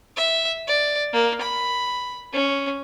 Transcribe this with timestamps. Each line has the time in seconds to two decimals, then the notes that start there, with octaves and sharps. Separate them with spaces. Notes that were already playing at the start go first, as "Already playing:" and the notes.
0.17 E5
0.68 D5
1.13 A#3
1.41 B5
2.33 C#4